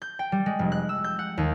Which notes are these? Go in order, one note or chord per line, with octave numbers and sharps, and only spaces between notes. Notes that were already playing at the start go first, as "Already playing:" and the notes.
G6
G5
G3
G#3
F1
F#6
E6
G6
F#5
D#2